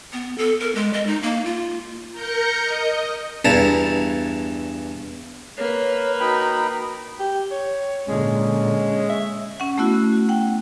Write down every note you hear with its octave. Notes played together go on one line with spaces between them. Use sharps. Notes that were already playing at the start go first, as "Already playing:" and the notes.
B3
A4
A#4
G#3
D#5
D#4
A#3
F4
A#4 G6 A#6 C#7
D#5
E2 G2 E4 A5 A#5
A#3 B4 C#5
D#4 F#4 G5 B5
G4
C#5
A#2 D3 G#3 C#4
E5
C#4 F#5
A3 B3 E4 F#4
F#4
F#5 G5